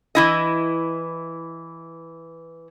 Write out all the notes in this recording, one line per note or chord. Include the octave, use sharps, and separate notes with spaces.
E3 E4 D#5